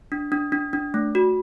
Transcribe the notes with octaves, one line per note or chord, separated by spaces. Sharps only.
D4
D4
D4
D4
A3
F#4